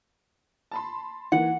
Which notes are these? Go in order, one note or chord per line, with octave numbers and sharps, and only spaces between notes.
A5 B5 C6
E3 A#3 F#5